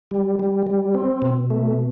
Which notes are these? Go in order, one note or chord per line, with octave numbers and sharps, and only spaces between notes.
G3
G3
G3
C4
B2
A3